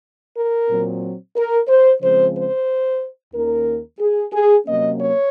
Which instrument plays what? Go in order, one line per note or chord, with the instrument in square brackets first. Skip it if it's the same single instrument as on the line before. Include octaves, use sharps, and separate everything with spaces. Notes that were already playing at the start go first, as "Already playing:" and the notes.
[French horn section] A#4
A#2 F#3 C4
A#4
C5
C#3 F3 G#3 C4 C5
C5
D#2 D#3 A#3 C#4 A#4
G#4
G#4
C3 F#3 A#3 C#4 D#5
C#5